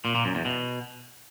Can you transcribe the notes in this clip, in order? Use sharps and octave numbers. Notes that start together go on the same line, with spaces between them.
A#2
A#2
F#2
E2
B2